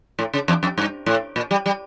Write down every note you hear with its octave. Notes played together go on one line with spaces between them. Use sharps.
A2
C#3
E2
F2
G2
A2
A#2
G3
G3